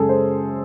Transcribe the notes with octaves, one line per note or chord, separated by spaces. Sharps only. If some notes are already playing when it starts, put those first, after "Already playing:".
Already playing: F#2 C#3 G#3 G#4 A4
C5